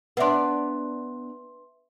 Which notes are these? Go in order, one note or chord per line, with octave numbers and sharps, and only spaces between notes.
B3 D4 B4 E5 C6